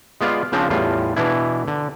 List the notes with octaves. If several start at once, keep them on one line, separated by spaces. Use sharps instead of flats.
G#3 B3 F4 D5 F5
C#3 F3 C4 D4
E2 A2 G3 F4
B2 E3 D4 E4
D3